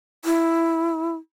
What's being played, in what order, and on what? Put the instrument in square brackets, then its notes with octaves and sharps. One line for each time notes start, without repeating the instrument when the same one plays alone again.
[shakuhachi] E4